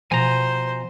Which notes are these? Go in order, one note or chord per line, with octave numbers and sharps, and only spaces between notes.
B2 F3 C5 G#5 A#5